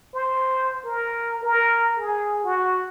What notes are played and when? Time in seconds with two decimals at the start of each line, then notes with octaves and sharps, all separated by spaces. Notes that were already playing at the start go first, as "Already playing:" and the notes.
0.14 C5
0.85 A#4
1.43 A#4
1.98 G#4
2.44 F#4